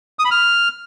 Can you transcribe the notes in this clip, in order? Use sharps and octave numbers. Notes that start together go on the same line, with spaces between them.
D#6
B5
F6